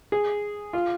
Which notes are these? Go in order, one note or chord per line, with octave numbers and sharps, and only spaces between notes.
G#4
F4